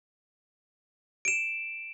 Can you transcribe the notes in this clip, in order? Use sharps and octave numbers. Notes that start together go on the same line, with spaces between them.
D7 E7